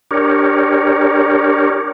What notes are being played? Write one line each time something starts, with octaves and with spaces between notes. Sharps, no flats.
D4 G4 A#4 C#5